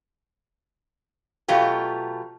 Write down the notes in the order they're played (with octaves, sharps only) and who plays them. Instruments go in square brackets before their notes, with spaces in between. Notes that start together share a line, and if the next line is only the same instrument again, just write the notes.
[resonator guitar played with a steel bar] B2 F#3 A3 F4 G4